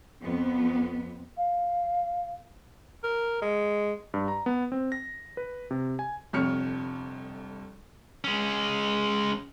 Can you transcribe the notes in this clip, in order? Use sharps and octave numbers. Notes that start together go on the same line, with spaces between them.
F2 B3
F5
A#4
G#3
G2
A#5
B3
C4
A#6
B4
C3
G#5
G1 F2 C3 C#5 F6 C#7
G#3 C#4